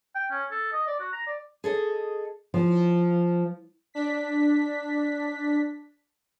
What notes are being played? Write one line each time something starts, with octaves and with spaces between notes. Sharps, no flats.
G5
C#4
A4
D#5
D5
F#4
A#5
D5
G#4 A4 D#5
F3
D4 B6